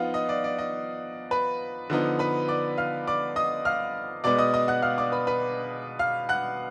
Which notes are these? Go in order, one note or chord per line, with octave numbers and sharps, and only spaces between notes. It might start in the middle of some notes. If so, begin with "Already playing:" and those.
Already playing: F3 B3 D#4 F4 F5 F#5
D#5
D5
D5
D#5
B4 B5
D3 F3 B3 D#4
B4 B5
D5 D6
F5 F6
D5 D6
D#5 D#6
F5 F6
B2 G#3 B3 D5 D6
D#5 D#6
D#5 D#6
F#5 F#6
F5 F6
D5 D6
B4 B5
B4 B5
F5 F6
F#5 F#6